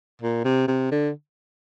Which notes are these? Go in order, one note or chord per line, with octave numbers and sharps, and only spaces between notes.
A#2
C3
C3
D3